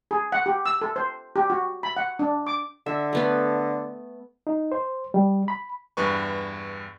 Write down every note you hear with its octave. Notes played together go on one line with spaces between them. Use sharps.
G#4
F#5
G4
E6
A4
C5
G4
F#4
B5
F#5
D4
D6
D3 E5
A3 B3 B5
D#4
C5
G3
B5
E2 G2 B4 C#6